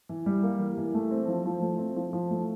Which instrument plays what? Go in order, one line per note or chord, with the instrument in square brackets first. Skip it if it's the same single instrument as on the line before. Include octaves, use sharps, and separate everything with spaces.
[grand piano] E3
G3
A#3
E3
E3
A3
C4
F3
F3
A3
C4
F3
F3
A3